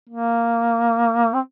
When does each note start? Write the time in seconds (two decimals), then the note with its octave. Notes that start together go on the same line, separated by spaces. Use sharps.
0.09 A#3
1.34 C4